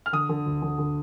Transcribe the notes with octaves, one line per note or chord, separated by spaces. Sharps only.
F6
D3 D#6
D3
D2
D3
D3